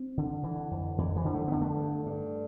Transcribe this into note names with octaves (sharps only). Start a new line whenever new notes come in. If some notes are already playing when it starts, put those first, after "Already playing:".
Already playing: C4
D3
D3 E3
F2
F2 E3
E3
D3
A3
D3 B3
A3
G2
G2